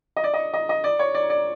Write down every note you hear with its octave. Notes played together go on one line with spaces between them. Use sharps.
D#5
D5
D#5
D#5
D#5
D5
C#5
D5
D5